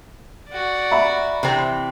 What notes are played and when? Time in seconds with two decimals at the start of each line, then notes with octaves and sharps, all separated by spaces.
0.49 F#4 D5
0.91 E5 A#5 B5
1.43 C3 E3 C4